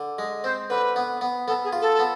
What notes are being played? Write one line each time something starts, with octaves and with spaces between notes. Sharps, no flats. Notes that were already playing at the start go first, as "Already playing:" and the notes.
Already playing: D3
G#3
C4 C5
D3 B4
B3
B3
B3 A4
G#4
F4
A4
B3